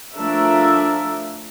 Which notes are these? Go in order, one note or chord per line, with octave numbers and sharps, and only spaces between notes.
F3 A3 D4 A#4 E5